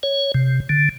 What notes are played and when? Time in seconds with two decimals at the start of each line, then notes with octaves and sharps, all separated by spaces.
0.03 C#5
0.34 C3
0.69 D3